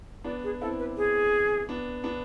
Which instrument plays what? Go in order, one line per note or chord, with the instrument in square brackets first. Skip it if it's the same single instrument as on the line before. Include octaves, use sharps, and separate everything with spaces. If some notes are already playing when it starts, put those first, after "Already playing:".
[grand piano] B3 D4 [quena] D5
[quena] G#4
[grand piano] C4 E4 [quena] A4
[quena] B4
G#4
[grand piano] B3 D4
B3 D4